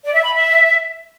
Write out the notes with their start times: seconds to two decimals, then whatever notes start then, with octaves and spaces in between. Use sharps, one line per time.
0.04 D5
0.14 E5
0.24 B5
0.34 E5